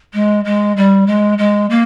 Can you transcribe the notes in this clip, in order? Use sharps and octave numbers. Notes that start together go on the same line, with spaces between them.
G#3
G#3
G3
G#3
G#3
A#3